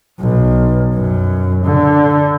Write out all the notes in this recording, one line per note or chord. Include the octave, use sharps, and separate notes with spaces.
B1
F#2
D3